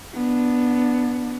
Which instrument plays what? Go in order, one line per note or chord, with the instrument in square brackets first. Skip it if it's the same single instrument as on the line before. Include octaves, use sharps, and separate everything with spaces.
[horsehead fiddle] B3 D4